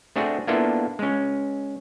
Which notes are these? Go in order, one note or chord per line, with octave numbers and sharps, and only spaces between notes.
A3 C4 D4 F#4 G#4
A#3 B3 D4 E4 F4 A4
G#3 C#4